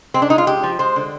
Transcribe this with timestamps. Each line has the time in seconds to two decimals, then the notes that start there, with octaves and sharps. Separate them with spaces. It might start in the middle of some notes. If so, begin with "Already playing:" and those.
0.14 G#3 C4
0.22 D4
0.30 G#3 D#4
0.38 F4
0.47 G#3 G4
0.63 F3
0.79 G#3 C5
0.96 D3